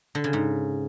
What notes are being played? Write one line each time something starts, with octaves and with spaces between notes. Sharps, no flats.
D3
C#3
G#2